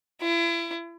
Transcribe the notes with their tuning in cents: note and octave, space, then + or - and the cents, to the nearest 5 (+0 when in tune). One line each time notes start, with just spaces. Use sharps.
E4 +35